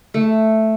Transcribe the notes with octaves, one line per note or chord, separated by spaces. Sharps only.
A3